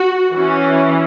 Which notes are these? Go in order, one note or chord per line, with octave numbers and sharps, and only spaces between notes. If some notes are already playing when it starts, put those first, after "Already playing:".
Already playing: F#4
E3 C#4